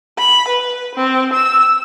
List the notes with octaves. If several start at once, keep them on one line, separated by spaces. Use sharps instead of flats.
B5
B4
C4
E6